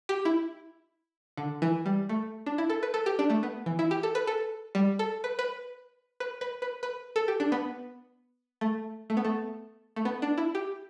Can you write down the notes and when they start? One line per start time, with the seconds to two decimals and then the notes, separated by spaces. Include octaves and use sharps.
0.09 G4
0.25 E4
1.37 D3
1.62 E3
1.86 G3
2.09 A3
2.46 D4
2.58 E4
2.70 A4
2.83 B4
2.94 A4
3.06 G4
3.19 D4
3.30 A3
3.43 B3
3.66 E3
3.79 E4
3.91 G4
4.03 A4
4.15 B4
4.27 A4
4.75 G3
4.99 A4
5.24 B4
5.39 B4
6.20 B4
6.41 B4
6.62 B4
6.83 B4
7.16 A4
7.28 G4
7.40 D4
7.52 B3
8.61 A3
9.10 A3
9.17 B3
9.25 A3
9.96 A3
10.05 B3
10.22 D4
10.38 E4
10.55 G4